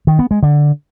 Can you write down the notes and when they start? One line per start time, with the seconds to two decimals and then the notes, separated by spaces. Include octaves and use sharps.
0.07 D#3
0.19 B3
0.31 G#3
0.43 D3